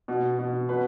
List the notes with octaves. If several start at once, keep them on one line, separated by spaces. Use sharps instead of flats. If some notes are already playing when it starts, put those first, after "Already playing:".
B2
B2
B2 B4